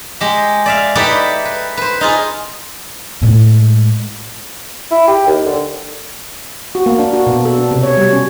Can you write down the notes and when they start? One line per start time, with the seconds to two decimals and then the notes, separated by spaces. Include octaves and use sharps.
0.21 G#3 G4
0.66 D5 E5 F5
0.95 D#4 E4 G4 A4 B4 D5
1.45 B4
1.77 B4 C5
2.01 D#4 F4 G#4
3.22 A2 G#3
4.91 E4
5.08 G4
5.27 D#2
5.46 D3
6.75 F#4
6.86 A#3
6.99 D4
7.13 F#4
7.27 B2
7.45 A4
7.58 D4
7.71 C3
7.83 C#5
7.97 G3
8.13 C#4